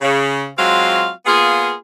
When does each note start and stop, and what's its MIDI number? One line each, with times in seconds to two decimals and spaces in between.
0.02 0.47 49
0.58 1.09 54
0.58 1.09 56
0.58 1.09 60
0.58 1.09 65
0.58 1.09 66
0.58 1.09 77
1.26 1.73 58
1.26 1.73 59
1.26 1.73 65
1.26 1.73 68